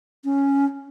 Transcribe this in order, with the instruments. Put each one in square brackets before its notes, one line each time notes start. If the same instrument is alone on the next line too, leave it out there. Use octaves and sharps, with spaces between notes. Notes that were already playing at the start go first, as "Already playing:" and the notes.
[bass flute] C#4